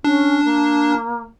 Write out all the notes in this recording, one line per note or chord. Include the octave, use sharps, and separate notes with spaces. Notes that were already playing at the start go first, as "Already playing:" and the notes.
C#4 D4
A#3